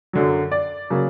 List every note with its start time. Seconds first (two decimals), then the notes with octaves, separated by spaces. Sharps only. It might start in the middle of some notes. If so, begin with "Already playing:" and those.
0.13 F#2 D3 F#3
0.52 D5
0.90 C#3 F#3 A#3